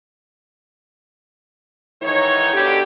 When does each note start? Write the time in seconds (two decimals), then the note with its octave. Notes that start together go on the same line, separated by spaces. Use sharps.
2.03 G#2 D#3 E3 D#4 C#5
2.54 B2 D3 D4 G4